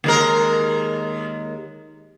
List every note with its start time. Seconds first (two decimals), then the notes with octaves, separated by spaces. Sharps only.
0.04 D#2 G#3 A#4